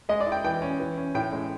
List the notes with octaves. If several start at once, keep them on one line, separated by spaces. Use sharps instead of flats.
G#3 D#5
D5
E4
G5
E3 G5
C#4
E3
C#4
A2 G5
G#3